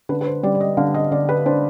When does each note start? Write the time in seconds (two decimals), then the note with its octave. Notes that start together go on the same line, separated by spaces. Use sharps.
0.09 D3 B4
0.21 B4
0.27 C5
0.43 G3 D5
0.55 D5
0.60 D#5
0.77 D3 F5
0.94 D#5
1.11 D3 D5
1.29 B4
1.46 D4 C5